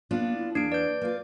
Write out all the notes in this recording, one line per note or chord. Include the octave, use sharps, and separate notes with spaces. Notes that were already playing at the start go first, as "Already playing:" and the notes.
A#3 B3 D4 F4
E4
E2 A#3 D4 D7
B4 D5 G6
A#3 F4